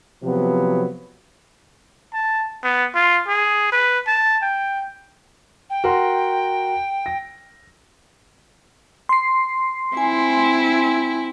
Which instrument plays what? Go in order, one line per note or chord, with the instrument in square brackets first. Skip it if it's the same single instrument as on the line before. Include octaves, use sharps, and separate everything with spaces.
[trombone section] C3 F3 F#3 B3
[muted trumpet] A5
B3
F4
G#4
B4
A5
G5
[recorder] G5
[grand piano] F#4 A#4 C6
A#6
[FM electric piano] C6 C7
[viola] C4 E4 [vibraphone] G#5